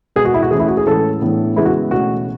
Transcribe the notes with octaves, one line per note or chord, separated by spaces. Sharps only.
B2 G#3 B3 G#4
F#4
E4
F#4
E3 A3 C#4 G#4
E4
F#4
G#4
A2 E3 G#3 C#4 A4
A2 E3 B3 D4
C#3 E3 G#3 B3 E4
F#4
B2 A3 C#4 F#4